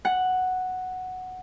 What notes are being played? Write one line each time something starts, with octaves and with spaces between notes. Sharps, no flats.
F#5